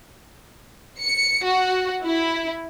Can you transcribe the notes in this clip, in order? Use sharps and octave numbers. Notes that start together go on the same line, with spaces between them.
C#7
F#4
E4